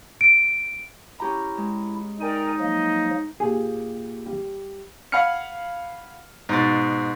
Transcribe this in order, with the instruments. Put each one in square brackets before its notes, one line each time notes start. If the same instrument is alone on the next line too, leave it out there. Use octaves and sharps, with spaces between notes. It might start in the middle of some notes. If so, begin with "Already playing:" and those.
[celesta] D7
[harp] C#4 G4 A#5 [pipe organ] E4
[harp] G#3
[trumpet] D#4 [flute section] A#4 D5 G5 [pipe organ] G#5
[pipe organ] F3 F#3 A#3 [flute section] D#5
[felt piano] A#2 G4 [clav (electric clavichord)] G#4
[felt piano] G3
[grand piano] F5 F#5 G#5 B5 F6 C#7
G#2 B2 A6